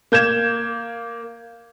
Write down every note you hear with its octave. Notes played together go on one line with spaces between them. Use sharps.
A#3 G6 G#6 E7